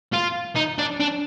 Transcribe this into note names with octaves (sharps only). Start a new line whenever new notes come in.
F4
D#4
D4
D4